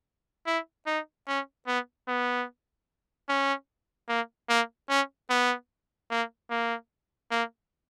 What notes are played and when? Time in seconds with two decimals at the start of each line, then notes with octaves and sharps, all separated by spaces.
0.46 E4
0.86 D#4
1.27 C#4
1.67 B3
2.08 B3
3.29 C#4
4.09 A#3
4.49 A#3
4.89 C#4
5.30 B3
6.10 A#3
6.50 A#3
7.31 A#3